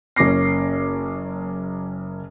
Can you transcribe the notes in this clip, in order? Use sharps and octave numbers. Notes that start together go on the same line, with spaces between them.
F#1 A#3 C#4 D6 A#6 C7